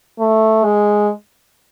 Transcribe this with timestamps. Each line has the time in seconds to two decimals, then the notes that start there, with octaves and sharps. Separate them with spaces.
0.19 A3
0.64 G#3